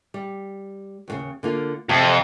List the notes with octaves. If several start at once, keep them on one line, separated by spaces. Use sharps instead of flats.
G3
D#2 A2 C#3
D3 A#3 F4
F2 C3